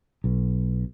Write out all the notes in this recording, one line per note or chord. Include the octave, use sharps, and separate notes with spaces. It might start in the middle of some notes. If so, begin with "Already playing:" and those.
B1